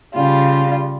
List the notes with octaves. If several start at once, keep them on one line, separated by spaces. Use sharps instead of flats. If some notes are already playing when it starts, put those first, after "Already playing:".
C#3 G3 F4